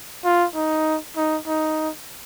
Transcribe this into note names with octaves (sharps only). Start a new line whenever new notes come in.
F4
D#4
D#4
D#4